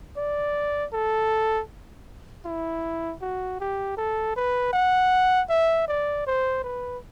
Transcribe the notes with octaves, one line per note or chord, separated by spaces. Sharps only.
D5
A4
E4
F#4
G4
A4
B4
F#5
E5
D5
C5
B4